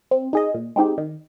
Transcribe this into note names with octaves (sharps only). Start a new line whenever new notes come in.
C4
D#4 G#4 D#5
A#2
G#3 C4 D#4 G4
D#3